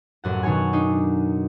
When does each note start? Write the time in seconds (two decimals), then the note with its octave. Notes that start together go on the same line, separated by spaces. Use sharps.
0.24 A1 F#2 F#5
0.43 B2 D#3 C#5 F#5 G#5
0.73 D4 D#4